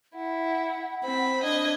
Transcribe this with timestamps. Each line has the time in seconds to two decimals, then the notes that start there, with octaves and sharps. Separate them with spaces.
0.15 E4 F#5
1.03 C4 C5 B5
1.43 D4 D#5 G#6